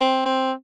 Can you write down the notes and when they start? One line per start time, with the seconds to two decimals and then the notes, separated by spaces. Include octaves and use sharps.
0.01 C4
0.25 C4